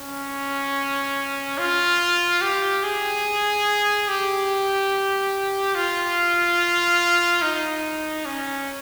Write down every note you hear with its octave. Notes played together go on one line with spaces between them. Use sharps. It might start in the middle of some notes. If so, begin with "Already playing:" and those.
Already playing: C#4
F4
G4
G#4
G4
F4
D#4
C#4